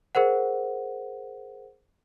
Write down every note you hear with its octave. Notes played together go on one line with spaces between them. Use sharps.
G#4 A#4 C5 F#5